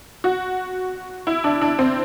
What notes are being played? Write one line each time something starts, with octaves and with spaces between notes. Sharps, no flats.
F#4
E4
D4
D4
C4